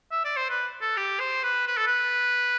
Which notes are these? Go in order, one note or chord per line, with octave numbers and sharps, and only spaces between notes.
E5
D5
C5
B4
A4
G4
C5
B4
B4
A4
B4